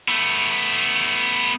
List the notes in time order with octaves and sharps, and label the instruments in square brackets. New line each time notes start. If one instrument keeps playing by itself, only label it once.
[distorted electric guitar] A3 B3